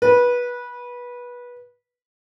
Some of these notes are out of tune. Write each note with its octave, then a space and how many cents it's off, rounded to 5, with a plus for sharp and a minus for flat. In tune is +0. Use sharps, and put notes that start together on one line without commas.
B4 -20